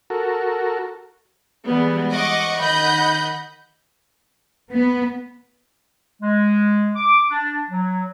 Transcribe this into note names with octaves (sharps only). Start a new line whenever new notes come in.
F#4 A4 A#4
E3 G3 G#3 B3
D#5 F#5 C#6 D6
D#3 D#5 F#5 B5 G6
B3
G#3
D6
D4
F#3